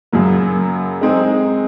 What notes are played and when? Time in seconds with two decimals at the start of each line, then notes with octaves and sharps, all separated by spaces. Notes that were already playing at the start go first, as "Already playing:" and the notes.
0.12 F#2 C#3 F#3 A#3
1.01 G#3 C4 D#4 G#4